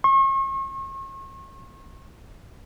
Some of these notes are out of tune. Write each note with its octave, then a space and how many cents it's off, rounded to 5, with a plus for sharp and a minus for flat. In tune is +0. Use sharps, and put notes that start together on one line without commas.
C#6 -40